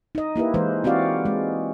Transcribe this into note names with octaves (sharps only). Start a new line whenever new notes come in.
D#4 D#5
A#3 E4 G4 B4
E3 G#3 B4 C5
C4 F#4 G4 D5 F5
G#3